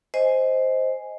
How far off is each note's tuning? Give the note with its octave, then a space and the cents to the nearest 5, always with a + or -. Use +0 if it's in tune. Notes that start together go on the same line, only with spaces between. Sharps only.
C5 +0 D#5 +5 G#5 +0